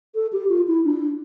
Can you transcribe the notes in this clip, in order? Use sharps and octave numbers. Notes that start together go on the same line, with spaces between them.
A4
G4
F4
E4
D4